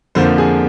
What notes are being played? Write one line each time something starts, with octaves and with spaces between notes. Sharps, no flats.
F2 D3 F3 A#3 C5
G#4